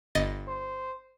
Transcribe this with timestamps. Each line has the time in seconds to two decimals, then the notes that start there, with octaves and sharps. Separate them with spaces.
0.15 G1 D#5 A6
0.48 C5